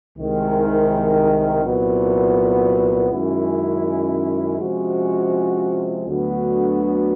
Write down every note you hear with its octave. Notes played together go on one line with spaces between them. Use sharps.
C2 C3 D#3 G#3
C2 A#2 F#3 B3
F#2 D#3 G#3 C#4 E4
C3 F3 G#3 C#4 F#4
D2 D3 F#3 B3